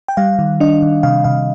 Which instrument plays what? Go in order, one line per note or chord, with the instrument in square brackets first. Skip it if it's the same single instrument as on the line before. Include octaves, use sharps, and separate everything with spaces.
[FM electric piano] G5
G3 F5
D#3
D4 D#5
D#3
C3 F5
C3 F5